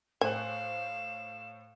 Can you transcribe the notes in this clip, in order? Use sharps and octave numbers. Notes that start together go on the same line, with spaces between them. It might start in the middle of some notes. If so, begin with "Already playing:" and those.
A2 C5 F5 G#5 F#6 E7